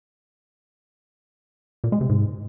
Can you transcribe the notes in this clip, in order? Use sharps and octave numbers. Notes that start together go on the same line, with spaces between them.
A#2
G#3
C3
G#2